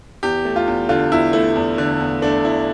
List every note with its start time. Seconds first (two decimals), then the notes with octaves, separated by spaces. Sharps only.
0.23 E2 G4
0.45 A3
0.56 F4
0.68 E2
0.89 D3 F4
1.12 E2 E4
1.33 A3 E4
1.56 E2
1.78 D3
2.01 E2
2.22 A3 D4
2.45 E2 E4